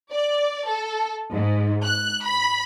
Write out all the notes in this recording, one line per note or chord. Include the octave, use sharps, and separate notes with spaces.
D5
A4
G#2
F#6
B5